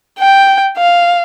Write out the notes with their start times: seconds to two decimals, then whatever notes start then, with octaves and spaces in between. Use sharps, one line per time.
0.19 G5
0.77 F5